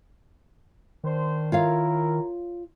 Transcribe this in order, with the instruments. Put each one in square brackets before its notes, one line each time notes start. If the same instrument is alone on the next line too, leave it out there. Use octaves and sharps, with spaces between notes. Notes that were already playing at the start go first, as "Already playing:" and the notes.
[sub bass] D#3 [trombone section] D4 C5
[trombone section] E4 A#4 [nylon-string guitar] F4 C#5 F5